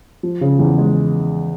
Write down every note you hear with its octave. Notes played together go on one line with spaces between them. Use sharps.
F3
C#3
E2
G#3